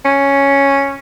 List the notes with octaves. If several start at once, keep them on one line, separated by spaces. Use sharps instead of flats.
C#4